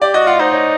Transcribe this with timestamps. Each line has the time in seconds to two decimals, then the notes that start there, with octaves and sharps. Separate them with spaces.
0.02 G4 D5
0.14 F#4 D#5
0.27 F4 F#5
0.39 D#4 C5
0.52 C#5